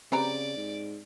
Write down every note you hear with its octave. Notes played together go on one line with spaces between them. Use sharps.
C#3 A#3 C4 G4 B4 D5 A#5
G#2